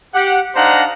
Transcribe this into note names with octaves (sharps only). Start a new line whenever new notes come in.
G4 F#5
D4 D#4 C5 F5 F#5 A#5